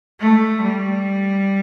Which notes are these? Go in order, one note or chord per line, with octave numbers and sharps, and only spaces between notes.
A3
G3